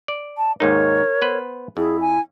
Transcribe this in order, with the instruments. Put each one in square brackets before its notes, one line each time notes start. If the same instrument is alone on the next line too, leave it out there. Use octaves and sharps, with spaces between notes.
[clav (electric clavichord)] D5
[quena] A5
[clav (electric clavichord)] D#2 G#2 D#4 [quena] A#4 [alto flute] C#5
[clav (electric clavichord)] B3 B4 C5
[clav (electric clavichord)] F2 [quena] E4 [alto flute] G#4
[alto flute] G#5